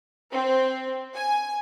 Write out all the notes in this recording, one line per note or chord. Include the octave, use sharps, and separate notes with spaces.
C4
G#5